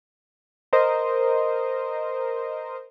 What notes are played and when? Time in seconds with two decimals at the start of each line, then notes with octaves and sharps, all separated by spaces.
0.73 A#4 C5 D#5